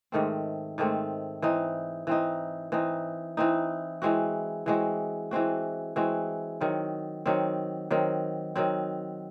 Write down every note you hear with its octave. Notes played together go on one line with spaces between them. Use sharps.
G#2 D#3 A3 C4
G#2 D#3 A3 C4
E3 C4 D#4
E3 C4 D#4
E3 C4 D#4
E3 C4 D#4
E3 G#3 C4 F#4
E3 G#3 C4 F#4
E3 G#3 C4 F#4
E3 G#3 C4 F#4
D#3 F#3 C4
D#3 F#3 C4
D#3 F#3 C4
D#3 F#3 C4